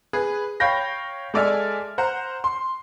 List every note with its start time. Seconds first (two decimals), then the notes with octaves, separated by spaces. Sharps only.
0.13 G#4 B4
0.60 C#5 F5 G5 B5 G6 A#6
1.34 G#3 A4 D5 E5 G#5 F6
1.98 C5 F#5 A#5
2.44 C6